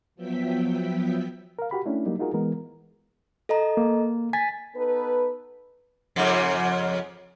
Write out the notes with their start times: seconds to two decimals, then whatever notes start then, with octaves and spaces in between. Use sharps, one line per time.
0.16 F3 F#3 B3 E5 G5 B6
1.59 A#4 F5
1.71 F#4 G4 B5
1.86 A3 C#4 D4 E4
2.06 F#3 G3 A#3 D#4
2.20 D#4 F4 F#4 G#4 A#4
2.34 E3 G#3 B3 A#4
3.49 A4 D#5 A#5
3.77 A#3
4.33 G#5 A6 B6
4.76 B3 D#4 A4 B4
6.16 F2 G#2 C#3